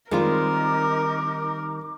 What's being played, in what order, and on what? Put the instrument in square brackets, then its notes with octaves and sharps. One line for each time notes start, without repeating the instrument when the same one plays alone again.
[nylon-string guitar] D#3 G3 C4 [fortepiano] G#3 F4 [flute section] D#4 D6 [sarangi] A#4